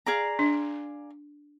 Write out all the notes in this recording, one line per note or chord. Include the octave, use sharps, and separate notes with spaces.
G#4 D5 F5 A#5
D4